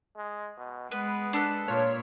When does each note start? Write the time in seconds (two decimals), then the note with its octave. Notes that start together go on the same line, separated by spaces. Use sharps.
0.16 G#3
0.57 B2
0.91 G#3 B3 B4
1.33 D4 A4 B4
1.68 A#2 F4 C#5